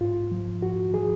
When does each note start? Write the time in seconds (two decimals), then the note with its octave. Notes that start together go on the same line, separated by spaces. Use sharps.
0.01 G#2 F4
0.32 F3
0.62 G#2 F#4
0.93 F3 G#4